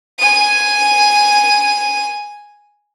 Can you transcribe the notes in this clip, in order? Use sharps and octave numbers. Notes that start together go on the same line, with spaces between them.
G#5 D#7